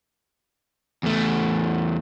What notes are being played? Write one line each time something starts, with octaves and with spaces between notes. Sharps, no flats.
E2 A3